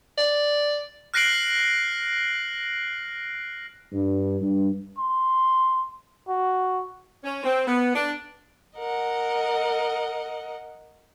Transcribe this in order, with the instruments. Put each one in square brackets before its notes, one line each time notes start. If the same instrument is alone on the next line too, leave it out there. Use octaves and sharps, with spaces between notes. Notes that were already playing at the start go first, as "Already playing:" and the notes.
[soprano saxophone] D5
[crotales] F6 F#6 A#6 C7 D7 F#7
[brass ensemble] G2
G2
[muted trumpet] C6
F#4
[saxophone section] C#4
C4
B3
D4
[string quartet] A#4 D#5 F#5